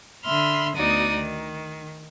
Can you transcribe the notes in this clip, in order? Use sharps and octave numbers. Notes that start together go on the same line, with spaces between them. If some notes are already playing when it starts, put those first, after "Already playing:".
D3 E5 B5 C6 F6
D2 B3 D#4 F#4 D5 D#6
D#3